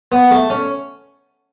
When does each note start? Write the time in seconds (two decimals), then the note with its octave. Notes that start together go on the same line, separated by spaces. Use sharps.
0.12 B3
0.31 A3
0.50 C#4